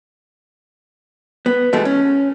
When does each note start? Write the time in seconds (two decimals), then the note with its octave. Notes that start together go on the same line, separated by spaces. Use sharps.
1.46 B3
1.73 B2 E3 G#3 A3
1.85 C#4